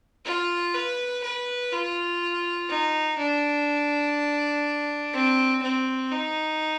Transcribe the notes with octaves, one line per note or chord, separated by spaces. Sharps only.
F4
B4
B4
F4
D#4
D4
C4
C4
D#4